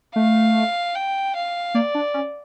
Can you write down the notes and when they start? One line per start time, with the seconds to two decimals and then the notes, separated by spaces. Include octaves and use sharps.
0.16 A3 F5
0.95 G5
1.36 F5
1.74 A#3 D5
1.95 D4
2.14 C#4